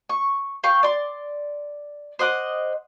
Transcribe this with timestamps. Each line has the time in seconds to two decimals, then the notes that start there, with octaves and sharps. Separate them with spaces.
0.09 C#6
0.64 F5 G5 C#6
0.83 D5 C6
2.19 C5 D#5 F#5 D6